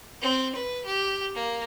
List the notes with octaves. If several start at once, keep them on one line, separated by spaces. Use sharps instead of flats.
C4
B4
G4
A#3